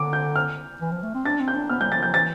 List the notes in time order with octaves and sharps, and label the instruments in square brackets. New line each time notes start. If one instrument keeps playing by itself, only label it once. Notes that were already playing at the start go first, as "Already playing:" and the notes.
Already playing: [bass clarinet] D3 [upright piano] D6
[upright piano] G6
F6
[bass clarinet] E3
F3
A3
C4
[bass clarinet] D4 [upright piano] A6
[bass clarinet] C4
[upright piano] G6
[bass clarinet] D4
[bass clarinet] B3 [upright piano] F6
[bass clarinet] G3 [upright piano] G6
[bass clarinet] F3 [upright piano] A6
[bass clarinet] F3 [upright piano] G6
[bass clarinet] E3 [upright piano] A6